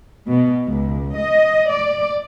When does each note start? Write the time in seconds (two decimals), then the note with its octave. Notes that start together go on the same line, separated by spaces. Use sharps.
0.28 B2
0.66 C#2
1.15 D#5
1.71 D5